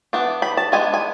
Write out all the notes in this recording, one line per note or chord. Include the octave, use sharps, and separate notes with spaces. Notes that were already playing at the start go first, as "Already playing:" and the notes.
E3 B3 D4
B5
A5
G#3 B3 D4 G#5
G#5